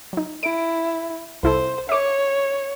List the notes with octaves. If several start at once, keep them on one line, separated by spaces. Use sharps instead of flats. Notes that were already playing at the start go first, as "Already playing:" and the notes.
F#3 D#4
E4 D7
C2 E4 A4 C5
C#5 E5 D6